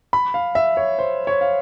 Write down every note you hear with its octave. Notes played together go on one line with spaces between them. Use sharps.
B5
F5
E5
C#5
C5
C#5
F5